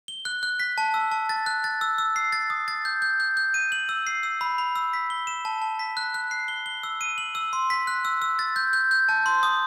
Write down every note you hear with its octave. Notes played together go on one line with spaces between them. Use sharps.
G7
F#6
F#6
B6
A5
E6
A5
A6
F#6
A6
E6
E6
C7
A6
D#6
A6
G6
G6
G6
G6
D#7
F#7
E6
C7
E6
B5
B5
E6
B6
G7
E7
A5
A5
B6
F#6
F#6
C7
G7
G7
E6
D#7
F#7
E6
C6
B6
F#6
E6
E6
A6
G6
G6
G6
A5
C6
D#6